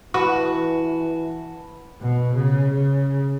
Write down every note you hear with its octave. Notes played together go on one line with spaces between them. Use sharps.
E3 F#4 B4 F#5 A5 B5
B2
C#3
C#3